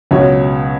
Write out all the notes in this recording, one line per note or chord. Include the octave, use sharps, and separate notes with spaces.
C#2 B2 F#3 C#5